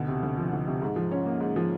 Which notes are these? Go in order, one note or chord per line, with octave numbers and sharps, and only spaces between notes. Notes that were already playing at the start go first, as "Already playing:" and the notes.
Already playing: D2 B2
C3
D2
F3
D2
C3
G#2
F3
C#4
A#3
G#2
F3